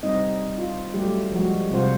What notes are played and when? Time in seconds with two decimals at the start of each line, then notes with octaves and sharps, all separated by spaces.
0.03 G3 C4 D#4 D#5
0.58 F4
0.94 F#3 G3 A3 G4
1.32 F3 G3 G#3 F#4
1.71 C3 G3 F4 C5 F#5